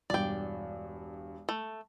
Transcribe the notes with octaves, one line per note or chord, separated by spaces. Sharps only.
E1 G2 D5 G5
A3